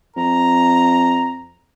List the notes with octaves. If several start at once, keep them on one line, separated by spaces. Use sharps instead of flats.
F2 A#5